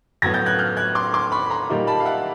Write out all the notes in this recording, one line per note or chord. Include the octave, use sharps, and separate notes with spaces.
A2 F#3 B3 G#6 A#6
G6 A6
F#6 G#6
F6 G6
F#6 G#6
C6 D6
C6 D6
B5 C#6
B5
A#5 C6
A#2 G3 A#3 D#4
A5 B5
F5
E5 F#5